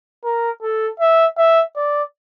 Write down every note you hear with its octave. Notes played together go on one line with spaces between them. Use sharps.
A#4
A4
E5
E5
D5